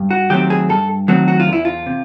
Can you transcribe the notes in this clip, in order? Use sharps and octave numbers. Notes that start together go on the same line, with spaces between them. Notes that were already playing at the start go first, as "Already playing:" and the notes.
Already playing: G2
F#4
D#3 F#3 A3 C4 G4
G#4
G2 A4
D#3 F#3 A3 C4 F#4
F#4
F4
E2
E4
F4
C3